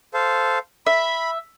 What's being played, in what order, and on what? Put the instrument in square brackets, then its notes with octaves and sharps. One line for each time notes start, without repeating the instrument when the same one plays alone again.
[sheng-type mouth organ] A4 C5 F5
[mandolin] E5 [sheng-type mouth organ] B5